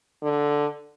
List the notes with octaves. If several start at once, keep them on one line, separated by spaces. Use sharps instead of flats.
D3